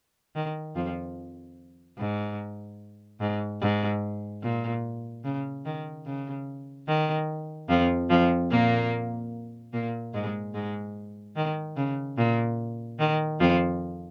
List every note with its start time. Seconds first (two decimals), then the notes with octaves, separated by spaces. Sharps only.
0.36 D#3
0.76 F2 F3
1.98 G#2
3.20 G#2
3.61 G#2
4.43 A#2
5.24 C#3
5.65 D#3
6.06 C#3
6.87 D#3
7.69 F2 F3
8.10 F2 F3
8.51 A#2 A#3
9.73 A#2 A#3
10.14 G#2 G#3
10.54 G#2 G#3
11.36 D#3
11.77 C#3
12.18 A#2
12.99 D#3
13.40 F2 F3